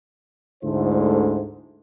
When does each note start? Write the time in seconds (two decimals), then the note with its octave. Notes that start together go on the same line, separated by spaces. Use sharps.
0.64 D2 G#2 D3 A3 E4 C5